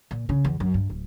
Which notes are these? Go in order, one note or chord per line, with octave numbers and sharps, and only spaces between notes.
A#2
C#3
E2
F#2
G2
D1